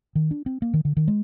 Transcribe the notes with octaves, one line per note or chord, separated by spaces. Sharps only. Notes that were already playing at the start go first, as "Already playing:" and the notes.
D#3
D4
C4
A#3
D#3
D3
D#3
G#3